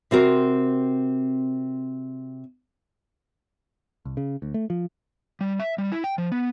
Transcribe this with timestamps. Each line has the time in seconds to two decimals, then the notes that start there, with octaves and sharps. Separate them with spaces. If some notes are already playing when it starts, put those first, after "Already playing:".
0.11 C3 C4 F#4 A#4 C5
4.05 C2
4.17 C#3
4.42 D2
4.54 A3
4.70 F3
5.41 G3
5.60 E5
5.78 G3
5.92 E4
6.04 G5
6.18 F3
6.32 B3